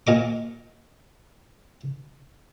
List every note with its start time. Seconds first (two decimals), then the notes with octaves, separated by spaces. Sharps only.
0.07 A#2 D#5 D6